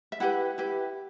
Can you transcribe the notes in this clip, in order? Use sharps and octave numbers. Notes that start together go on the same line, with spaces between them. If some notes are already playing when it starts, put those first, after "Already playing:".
E5
E4 G4 B4 F#5
E4 G4 B4